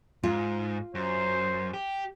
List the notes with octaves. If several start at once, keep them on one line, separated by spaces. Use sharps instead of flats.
G#2 F4
F#2 C5
G4